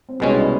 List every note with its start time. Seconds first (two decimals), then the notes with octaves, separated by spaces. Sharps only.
0.09 C4
0.20 C2 B2 G#3 B3 C#4
0.35 D4 E4